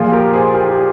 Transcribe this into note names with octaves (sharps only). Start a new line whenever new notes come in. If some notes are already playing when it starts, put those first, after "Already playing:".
Already playing: A#2 F3 F4 G#4
G4 A#4
G#4 C5
G4 A#4
G4 A#4